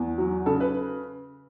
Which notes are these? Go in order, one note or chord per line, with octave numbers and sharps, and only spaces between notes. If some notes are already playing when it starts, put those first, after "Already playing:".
Already playing: E2
F#3
C#3 A4
B4